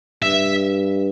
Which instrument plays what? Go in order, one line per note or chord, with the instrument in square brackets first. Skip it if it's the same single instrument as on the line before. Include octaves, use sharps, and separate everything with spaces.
[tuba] G2 [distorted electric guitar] E5